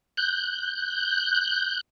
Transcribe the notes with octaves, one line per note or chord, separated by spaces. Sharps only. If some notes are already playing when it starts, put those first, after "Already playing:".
F#6 G6